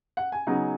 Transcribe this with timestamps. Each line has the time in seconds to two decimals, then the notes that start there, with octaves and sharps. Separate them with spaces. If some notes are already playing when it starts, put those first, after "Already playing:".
0.17 F#5
0.32 G#5
0.47 C#3 F#3 B3 D#4